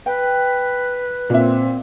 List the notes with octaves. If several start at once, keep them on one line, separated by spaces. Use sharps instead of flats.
B4 G5
A#2 C4 E5